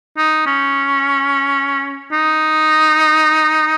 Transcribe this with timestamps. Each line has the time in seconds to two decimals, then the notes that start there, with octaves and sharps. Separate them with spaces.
0.17 D#4
0.46 C#4
2.12 D#4